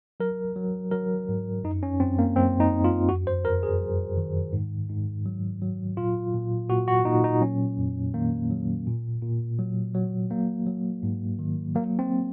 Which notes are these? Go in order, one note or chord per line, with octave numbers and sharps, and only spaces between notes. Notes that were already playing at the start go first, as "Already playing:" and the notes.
F#3 A#4
F#3
F#3 A#4
G#2
F#2 D#4
C#4
F#2 C4
A#3
F#2 C4
D#4
F#2
F4
F2 F#4
C5
F2 A#4
G#4
F#3
D#3
G#2
G#2
F#3
F#3
A#2 F4
A#2
A#2 F#4
F#4
A#2 D#4
D#4
F#3 C#4
F2
D#3 A#3
F#3
A#2
A#2
F#3
F#3
F#3 A#3
F#3
G#2
D#3
F#3 A#3
C4